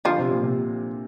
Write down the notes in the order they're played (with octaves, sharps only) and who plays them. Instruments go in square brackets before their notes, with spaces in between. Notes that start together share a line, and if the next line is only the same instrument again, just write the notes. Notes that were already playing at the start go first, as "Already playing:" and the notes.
[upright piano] D3 [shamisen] F3 F4
[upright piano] C3
A#2
C3